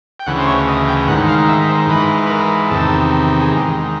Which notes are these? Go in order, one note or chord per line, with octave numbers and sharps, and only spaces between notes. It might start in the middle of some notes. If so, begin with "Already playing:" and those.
G5
D2 C#3 E3 F#5
C5
C#5
D#5
G5
G#2 D#3 F#5
F5
E5
C5
G#2 E3 B4
B4
A#4
E2 C3 D#3 A4
G#4
G#2 D#3 G4